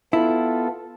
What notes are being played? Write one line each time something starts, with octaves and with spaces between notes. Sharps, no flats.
B3 E4 F4 A4